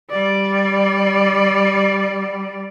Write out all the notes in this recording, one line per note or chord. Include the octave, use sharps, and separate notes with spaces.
G3 D5